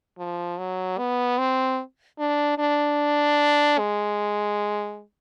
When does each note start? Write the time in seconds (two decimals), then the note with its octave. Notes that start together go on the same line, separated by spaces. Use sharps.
0.18 F3
0.58 F#3
0.98 B3
1.38 C4
2.19 D4
2.58 D4
3.78 G#3